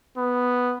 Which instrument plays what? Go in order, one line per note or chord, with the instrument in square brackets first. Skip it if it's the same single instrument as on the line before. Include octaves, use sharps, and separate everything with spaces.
[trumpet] B3